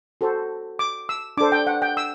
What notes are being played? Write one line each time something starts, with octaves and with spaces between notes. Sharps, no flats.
F#4 A4 C5
D6
E6
D4 A4 C5 D6
G5
F#5
G5
E6